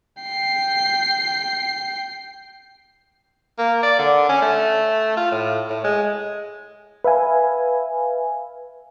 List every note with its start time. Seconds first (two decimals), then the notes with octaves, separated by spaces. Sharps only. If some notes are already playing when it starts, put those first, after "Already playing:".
0.23 G5 C7
3.59 A#3
3.83 D5
3.99 D3
4.29 C#4
4.42 A3
5.17 F4
5.31 A2
5.70 A2
5.84 G#3
7.04 B4 E5 F5 G#5